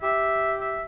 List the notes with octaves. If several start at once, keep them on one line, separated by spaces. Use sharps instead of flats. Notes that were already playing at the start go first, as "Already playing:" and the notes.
G4 E5
E5